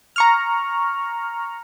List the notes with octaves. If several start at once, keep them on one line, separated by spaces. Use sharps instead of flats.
A#5 C#6 F6